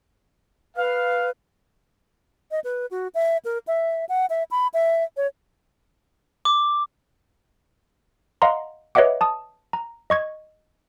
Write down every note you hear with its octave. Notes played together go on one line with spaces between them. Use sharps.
B4 F5
D#5
B4
F#4
E5
A#4
E5
F#5
E5
B5
E5
C#5
D6
D#5 F5 F#5 A#5 C6
B4 C#5 D#5 E5 F#5 D6
A5 D#6
A#5
D#5 C#6 G#6